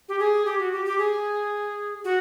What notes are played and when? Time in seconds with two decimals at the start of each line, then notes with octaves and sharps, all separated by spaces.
0.08 G4
0.19 G#4
0.45 G4
0.59 F#4
0.72 G4
0.85 G4
0.98 G#4
2.04 F#4